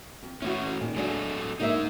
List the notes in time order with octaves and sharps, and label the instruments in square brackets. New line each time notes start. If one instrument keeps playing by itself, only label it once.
[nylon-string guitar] F2
[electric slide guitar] A3 C#4 [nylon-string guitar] E4 F#4
[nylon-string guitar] A#2 D#3 G#3
[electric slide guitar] F#3 A3 A4 [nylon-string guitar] G#3 D4 F#4
[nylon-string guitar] D3 A#3 E5 [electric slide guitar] G#3 D#4